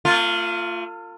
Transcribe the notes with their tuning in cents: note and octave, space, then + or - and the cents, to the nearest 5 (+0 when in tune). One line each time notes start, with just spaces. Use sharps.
A3 +45 F4 +0